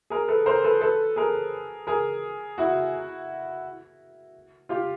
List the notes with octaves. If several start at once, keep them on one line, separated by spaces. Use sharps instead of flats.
G#4 A#4
A4 B4
A#4 C5
A4 B4
A4 B4
G#4 A#4
G#4 A#4
E4 F#4
F4 G4